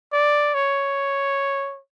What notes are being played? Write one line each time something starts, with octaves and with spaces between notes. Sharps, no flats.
D5
C#5